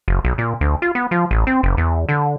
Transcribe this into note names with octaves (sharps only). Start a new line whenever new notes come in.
F#1
B1
A#2
D2
F4
B3
F3
A1
C4
F#1
E2
D3